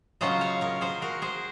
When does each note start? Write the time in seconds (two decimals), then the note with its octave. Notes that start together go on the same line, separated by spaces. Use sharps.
0.21 C#3 F#3 C#4 F4 C5 D#5
0.41 C#5 F5
0.61 A#4 C#5
0.81 G#4 C5
1.02 F#4 A#4
1.22 G#4 C5